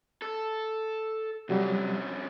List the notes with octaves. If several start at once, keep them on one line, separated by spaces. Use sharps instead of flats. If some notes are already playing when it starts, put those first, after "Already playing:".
A4
F2 C3 F#3 G3 C#4